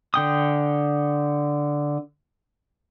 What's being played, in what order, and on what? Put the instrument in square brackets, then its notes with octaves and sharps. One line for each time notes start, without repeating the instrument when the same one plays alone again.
[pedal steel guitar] D3 G5 D#6